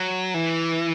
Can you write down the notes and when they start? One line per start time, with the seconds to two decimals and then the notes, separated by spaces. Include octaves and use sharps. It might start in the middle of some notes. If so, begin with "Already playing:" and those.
Already playing: F#3
0.34 E3